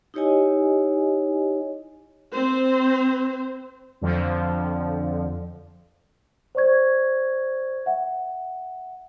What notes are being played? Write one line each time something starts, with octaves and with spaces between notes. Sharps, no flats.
D#4 E4 G4 C#5 D#5 G#5
C4 C5
F2 D3 F3
C5 D5 C#6 G#6
E5 F#5